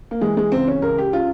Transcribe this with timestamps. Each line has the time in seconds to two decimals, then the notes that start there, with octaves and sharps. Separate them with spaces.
0.11 A#3
0.21 E3 G#3
0.37 G#3
0.52 C#2 C4
0.68 C#4
0.82 C#2 A#4
0.98 G4
1.13 C#3 F4